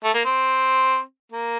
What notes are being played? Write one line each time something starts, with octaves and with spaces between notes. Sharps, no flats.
A3
A#3
C4
A#3